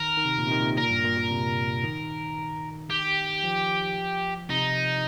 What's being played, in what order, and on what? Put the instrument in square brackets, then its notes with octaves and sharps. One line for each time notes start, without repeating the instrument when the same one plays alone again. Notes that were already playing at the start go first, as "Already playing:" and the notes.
Already playing: [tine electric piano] D#3 [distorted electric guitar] A#4
[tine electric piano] D#3
C3
A#2
C3
D#3
A#2
C3
[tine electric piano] A#2 [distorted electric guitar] A#4
[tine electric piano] G2
A#2
A#2
C3
D#3
[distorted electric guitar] G4
[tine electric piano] F3
[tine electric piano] C3 [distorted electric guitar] D#4